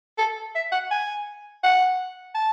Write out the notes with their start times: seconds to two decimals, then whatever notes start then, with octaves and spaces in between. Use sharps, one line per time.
0.18 A4
0.55 E5
0.72 F#5
0.91 G#5
1.63 F#5
2.35 A5